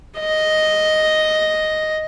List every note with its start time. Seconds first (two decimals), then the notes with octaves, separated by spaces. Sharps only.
0.20 D#5